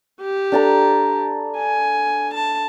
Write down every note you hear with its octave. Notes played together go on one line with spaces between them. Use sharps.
G4
D4 A4 A#5
G#5
A5